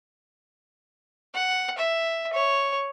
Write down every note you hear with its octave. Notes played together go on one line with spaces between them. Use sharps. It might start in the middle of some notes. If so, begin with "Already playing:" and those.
F#5
E5
C#5